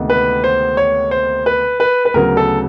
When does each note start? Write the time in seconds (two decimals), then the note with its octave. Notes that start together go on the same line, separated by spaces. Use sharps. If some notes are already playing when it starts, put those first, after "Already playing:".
Already playing: D2 C3 D#3 G#3 B3
0.10 B4
0.44 C5
0.77 C#5
1.11 C5
1.46 B4
1.80 B4
2.05 B4
2.14 D2 C#3 F#3 B3 A#4
2.37 A4